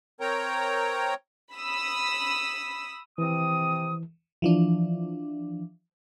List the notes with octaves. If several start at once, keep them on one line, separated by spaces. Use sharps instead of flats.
C4 A#4 C#5 G5 A#5
B5 D#6 E6 B6
C3 E3 C4 D#6
E3 F3 D4